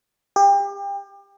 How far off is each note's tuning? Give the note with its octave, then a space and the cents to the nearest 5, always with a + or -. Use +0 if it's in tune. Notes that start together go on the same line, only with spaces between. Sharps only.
G4 +30